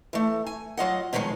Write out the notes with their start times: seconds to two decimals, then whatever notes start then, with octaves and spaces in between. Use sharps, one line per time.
0.13 E3 A3
0.47 G#5
0.77 F#3 F4 D#5 F#5
1.13 B2 D#3 F3 F#3 G#3